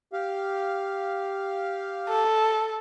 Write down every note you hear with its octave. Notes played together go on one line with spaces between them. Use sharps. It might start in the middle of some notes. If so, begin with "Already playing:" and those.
G4 F5
A4